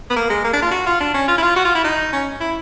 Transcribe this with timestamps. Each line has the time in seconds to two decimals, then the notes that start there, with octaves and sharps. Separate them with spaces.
0.10 B3
0.16 A#3
0.30 G#3
0.44 A#3
0.53 D4
0.62 F4
0.71 F#4
0.86 F4
1.00 D4
1.14 C#4
1.28 F4
1.38 E4
1.42 F4
1.56 F#4
1.65 F4
1.75 E4
1.84 D#4
2.13 C#4
2.41 E4